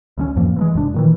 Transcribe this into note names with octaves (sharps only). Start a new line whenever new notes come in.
D2 G3 C#4
F2 A2 F3 A#3
E3 F#3 G#3
D#1 F#2 C3 D4
A#2 D#3 E3